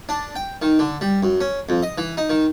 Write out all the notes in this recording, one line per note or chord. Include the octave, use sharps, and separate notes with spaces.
D4
G5
D#3
D3
G3
F#2
C#4
F2
D#5
E3
D#4
D#3